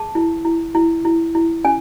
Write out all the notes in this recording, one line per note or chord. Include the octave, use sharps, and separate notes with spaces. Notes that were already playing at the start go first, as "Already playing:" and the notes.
Already playing: G#4 A5
E4
E4
E4
E4
E4
C#4 G#5